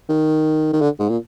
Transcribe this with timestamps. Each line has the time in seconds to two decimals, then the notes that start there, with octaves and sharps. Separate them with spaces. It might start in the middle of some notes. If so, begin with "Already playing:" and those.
0.09 D#3
0.73 D#3
0.81 D3
0.99 G#2
1.09 A#2